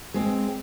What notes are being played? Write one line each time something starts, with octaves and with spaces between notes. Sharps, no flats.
G#3 C4